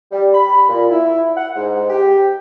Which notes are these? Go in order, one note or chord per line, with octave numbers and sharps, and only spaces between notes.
G3
B5
A#2
E4
F#5
G#2
G4